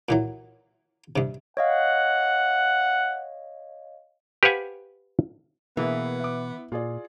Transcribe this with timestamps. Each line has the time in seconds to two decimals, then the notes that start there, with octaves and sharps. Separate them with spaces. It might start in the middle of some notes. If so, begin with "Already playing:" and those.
0.09 A#2 E3 F#3
1.16 G2 C3
1.57 C#5 D#5 F5 F#5
4.43 G4 B4 C5 F5 F#5 G#5
5.77 B2 E3 A#3 B3 G#4
6.20 E5 D6
6.72 A#2 F4 G#4 D5